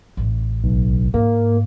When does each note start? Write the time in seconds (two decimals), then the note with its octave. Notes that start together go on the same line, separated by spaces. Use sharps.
0.17 A1
0.63 B1
1.14 G#2 A#3